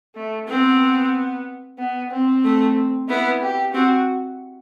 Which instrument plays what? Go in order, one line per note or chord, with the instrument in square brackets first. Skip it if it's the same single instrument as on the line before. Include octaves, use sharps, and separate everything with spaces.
[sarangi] A3
[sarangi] B3 [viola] C4
[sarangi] B3
C4
[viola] A3
[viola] B3 [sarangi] E4
[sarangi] G4
[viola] C4 [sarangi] F#4